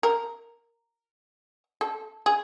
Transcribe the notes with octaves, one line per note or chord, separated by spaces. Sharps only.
A#4
A4
G#4